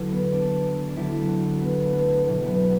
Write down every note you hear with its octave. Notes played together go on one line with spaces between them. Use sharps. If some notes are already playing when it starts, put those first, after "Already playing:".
Already playing: E2 D3 F#3
B3
D4
D4
D2 D3 F#3 E4
F#4
B3
A3
B3
F#1 E2 B2 F#3
B3